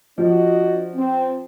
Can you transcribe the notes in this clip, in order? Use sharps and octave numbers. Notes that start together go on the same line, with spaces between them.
F3 D4 F#4 D#5
C4